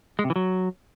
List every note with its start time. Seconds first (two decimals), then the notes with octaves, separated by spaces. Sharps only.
0.19 G#3
0.24 C3
0.30 E3
0.36 F#3